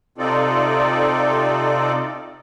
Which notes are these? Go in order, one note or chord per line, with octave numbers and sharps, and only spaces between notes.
C3 C4 D#4 F4 A4 D5